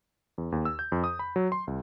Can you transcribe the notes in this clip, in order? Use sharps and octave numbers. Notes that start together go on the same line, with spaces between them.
E2
D#2
E6
G6
F2
D#6
B5
F#3
C6
C2